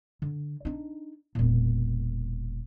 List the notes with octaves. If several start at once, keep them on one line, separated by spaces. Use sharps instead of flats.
D3
D4 D#4
E1 A#2